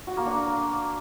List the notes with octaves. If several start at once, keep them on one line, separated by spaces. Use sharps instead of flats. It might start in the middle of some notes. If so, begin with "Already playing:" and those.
F#4
A#3
D4
A#3